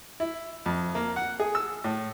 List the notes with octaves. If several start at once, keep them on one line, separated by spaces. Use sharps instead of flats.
E4
F2
A#3
F#5
G#4
E6
A2